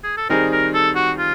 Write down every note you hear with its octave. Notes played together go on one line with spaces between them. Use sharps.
G#4
A4
D#3 G3 C4 D#4 G#4 A#4
A#4
A4
F#4
F4